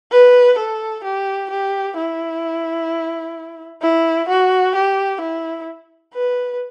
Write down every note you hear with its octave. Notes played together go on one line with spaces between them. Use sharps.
B4
A4
G4
G4
E4
E4
F#4
G4
E4
B4